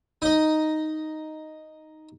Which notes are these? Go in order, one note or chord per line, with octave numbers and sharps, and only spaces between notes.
D#4 D#5